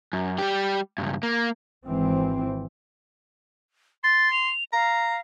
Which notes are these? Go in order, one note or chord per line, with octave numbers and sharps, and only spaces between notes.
F#2
G3 G4
C#2 G2
A#3
G#1 E3 C4
C6 A6
F7
F5 A#5